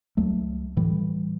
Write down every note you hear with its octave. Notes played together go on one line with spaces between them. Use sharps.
C#2 F#3 A3
A2 E3 G3